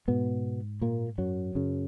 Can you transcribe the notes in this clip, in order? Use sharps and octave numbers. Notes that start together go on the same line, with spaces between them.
G#2 B2 B3
A#2 A#3
F#2 F#3
F#2 C#3